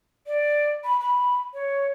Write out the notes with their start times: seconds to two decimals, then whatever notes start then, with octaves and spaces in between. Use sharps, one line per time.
0.27 D5
0.84 B5
1.00 B5
1.54 C#5